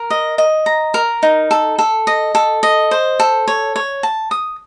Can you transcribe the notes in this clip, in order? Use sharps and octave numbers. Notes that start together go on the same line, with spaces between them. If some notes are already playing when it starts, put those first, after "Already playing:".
Already playing: A#4
D#5
D#5
A#5
A#4
D#4
A4
A4
D#5
A4
D#5
C5
A4
C#5
C#5
A5
D#6